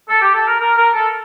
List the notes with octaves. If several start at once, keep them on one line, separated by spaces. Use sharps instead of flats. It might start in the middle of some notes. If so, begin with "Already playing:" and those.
A4
G4
A4
A#4
A#4
A#4
A4